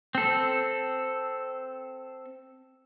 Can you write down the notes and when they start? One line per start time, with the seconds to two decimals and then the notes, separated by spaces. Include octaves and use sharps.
0.15 C4 A4